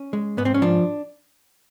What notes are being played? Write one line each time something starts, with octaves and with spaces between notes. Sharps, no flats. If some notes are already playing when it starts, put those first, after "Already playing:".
Already playing: C#4
G#3
G#2 B3
C4
C#4
F3 D4